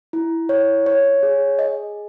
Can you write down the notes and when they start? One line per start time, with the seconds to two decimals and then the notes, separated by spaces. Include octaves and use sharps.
0.13 E4
0.49 C#5
0.86 C#5
1.23 G#4
1.59 D#5